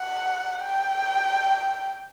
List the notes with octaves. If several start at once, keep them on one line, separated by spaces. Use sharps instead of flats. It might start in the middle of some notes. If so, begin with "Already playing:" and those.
Already playing: F#5
G5